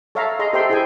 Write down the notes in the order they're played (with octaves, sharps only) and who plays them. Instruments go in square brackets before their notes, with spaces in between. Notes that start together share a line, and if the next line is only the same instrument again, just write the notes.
[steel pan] A4 C#5 E5 F5 A5 A#5
G#4 D#5 A#5 C6
G4 A4 C5 E5 G5 C6
E4 G#4 C5 G5 G#5